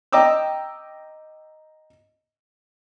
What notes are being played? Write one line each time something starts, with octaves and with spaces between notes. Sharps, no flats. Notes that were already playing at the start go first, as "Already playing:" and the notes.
D#5 G5 A#5 D6 E6